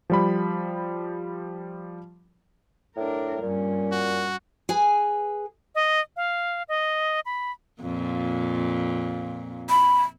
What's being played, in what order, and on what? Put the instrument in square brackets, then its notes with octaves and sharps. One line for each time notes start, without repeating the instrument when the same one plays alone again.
[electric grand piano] F3 G3 B5
[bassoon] A2 [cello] D4 A#4
[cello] G2 C#4 [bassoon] A#2
[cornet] F#4
[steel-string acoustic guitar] G#4 B4 G#5
[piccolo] D#5
F5
D#5
B5
[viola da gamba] F2 A#2
[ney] B5